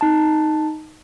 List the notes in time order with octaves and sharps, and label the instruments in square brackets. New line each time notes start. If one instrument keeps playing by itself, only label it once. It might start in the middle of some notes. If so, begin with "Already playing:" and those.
[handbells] D#4 A5